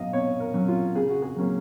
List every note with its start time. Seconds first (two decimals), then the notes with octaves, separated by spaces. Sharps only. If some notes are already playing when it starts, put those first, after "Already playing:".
Already playing: B2 F#3 C#4 D#5 F5
0.13 B2 C#5
0.40 A#4
0.54 F#3 C#4
0.68 F4
0.95 C#3 G#4
1.09 F#4
1.22 G#4
1.37 F#3 A#3 C#4